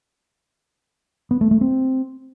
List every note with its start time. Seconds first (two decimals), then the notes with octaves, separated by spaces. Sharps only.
1.31 B3
1.41 A3
1.51 A3
1.61 C4